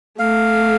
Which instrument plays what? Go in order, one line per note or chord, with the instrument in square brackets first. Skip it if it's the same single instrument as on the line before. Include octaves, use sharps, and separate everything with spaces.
[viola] A3 [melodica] F5